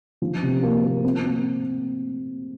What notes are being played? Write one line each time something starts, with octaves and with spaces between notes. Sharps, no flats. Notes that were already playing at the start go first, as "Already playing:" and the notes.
F3
C3
A#3
A#3
C4
C4